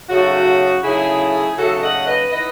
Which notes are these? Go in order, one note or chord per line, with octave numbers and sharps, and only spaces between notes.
C#3 F#3 A3 D#4 F#4
C#3 F#3 A3 D#4 E4 G#4
C#3 F#3 A3 D#4 F#4 A4
D#5 F#5
B4 D#5
E3 B3 D#4 B4 D#5